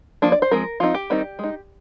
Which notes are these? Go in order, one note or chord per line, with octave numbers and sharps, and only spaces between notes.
F3 A#3 D4
D5
C5
F3 G#3 C4 A#4
F3 C4 D#4 F4
G4
D#3 G3 C4 D#4
G#3 D#4